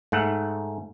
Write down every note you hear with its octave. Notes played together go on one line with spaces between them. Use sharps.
G#2 A3 F#5